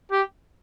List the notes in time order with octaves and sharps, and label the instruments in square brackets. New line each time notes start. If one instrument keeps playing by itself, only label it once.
[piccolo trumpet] G4